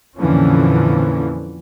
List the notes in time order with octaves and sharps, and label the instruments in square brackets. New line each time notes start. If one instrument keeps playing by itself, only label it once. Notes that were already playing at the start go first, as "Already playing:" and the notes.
[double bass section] F2 A#2 D3 E3 F3 C#4